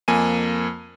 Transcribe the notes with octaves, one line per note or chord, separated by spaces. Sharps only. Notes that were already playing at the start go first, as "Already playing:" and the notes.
F2 A#3 G#5 D#7